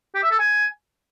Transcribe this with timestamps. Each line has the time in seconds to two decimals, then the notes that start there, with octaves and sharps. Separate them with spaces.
0.15 G4
0.23 E5
0.31 A4
0.39 G#5